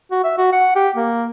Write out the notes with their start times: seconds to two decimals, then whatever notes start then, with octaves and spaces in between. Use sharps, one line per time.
0.11 F#4
0.24 E5
0.38 F#4
0.53 F#5
0.76 G4
0.96 A#3